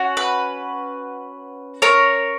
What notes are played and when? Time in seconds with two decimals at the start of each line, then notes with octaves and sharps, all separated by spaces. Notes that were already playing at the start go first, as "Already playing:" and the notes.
Already playing: C#4 F#4
0.17 B4
1.82 A#4 C#5